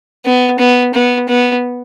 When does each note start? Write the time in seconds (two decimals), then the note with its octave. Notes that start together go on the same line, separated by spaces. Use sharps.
0.25 B3
0.59 B3
0.94 B3
1.29 B3